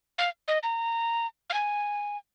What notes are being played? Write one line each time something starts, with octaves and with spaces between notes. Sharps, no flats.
F5
D#5
A#5
F5
G#5